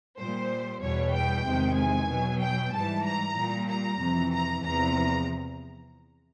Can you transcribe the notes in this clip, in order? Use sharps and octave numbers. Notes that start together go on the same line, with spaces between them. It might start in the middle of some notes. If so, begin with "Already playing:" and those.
A#2 G3 C5
E2 B2 G3 C#5
G5
E2 C3 D#3 G#3
G#5
B2 F#3
G5
G#2 E3 G3 A5
A#5
A#2 G3
A#5
F2 C3 E3
A#5
E2 C3 F3 A#5